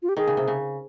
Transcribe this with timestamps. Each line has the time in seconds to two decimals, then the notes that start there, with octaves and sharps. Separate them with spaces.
0.02 F4
0.09 G4
0.17 D#3 G#4
0.27 C#3
0.37 C3
0.48 C#3